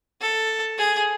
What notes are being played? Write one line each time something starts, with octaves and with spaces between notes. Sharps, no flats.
A4
G#4